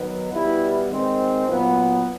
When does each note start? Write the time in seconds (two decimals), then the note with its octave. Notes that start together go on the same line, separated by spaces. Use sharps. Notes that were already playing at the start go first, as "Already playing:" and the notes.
Already playing: D#3 F#3 B3
0.33 B2 G3 B3 E4
0.90 D#3 G#3 C4
1.46 A#2 F#3 B3